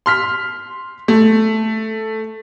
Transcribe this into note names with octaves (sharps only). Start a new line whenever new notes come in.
C6 F6 B6
A3